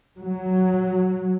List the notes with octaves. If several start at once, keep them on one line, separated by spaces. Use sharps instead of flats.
F#3